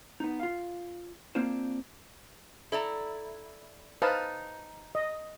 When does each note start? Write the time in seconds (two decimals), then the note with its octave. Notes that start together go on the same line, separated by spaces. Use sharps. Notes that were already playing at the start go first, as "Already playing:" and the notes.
0.20 B3 D#4
0.40 F4 F5
1.35 A#3 C4 D4 F4 C5
2.72 E4 A4 D5 A#5
4.02 D#4 B4 C5 F5 A5
4.95 D#5